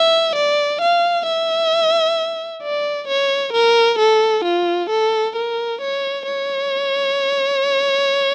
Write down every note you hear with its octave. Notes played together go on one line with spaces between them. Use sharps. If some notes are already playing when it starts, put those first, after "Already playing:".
Already playing: E5
D5
F5
E5
D5
C#5
A#4
A4
F4
A4
A#4
C#5
C#5